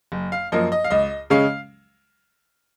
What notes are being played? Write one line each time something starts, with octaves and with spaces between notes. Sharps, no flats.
F#1
F5
F#2 F3 A#3 D#5
D#5
F5
C#2 D#5
C#3 G#3 C#4 F5